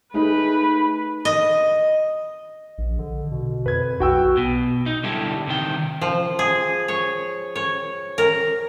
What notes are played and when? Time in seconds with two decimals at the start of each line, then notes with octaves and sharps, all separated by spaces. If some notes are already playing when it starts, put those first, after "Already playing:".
0.14 A3 D#4 G#4 B4
1.25 D#5
2.78 A#1
2.99 D3
3.31 B2
3.66 F2 B4 G#6
4.00 B1 F#4 G5 E6
4.37 B2
4.86 D#4
5.03 D3 G3 E4 G4 A4
5.47 C3 D#3 G5
6.01 F3
6.39 G#4
6.88 C#5
7.56 C#5
8.18 A#4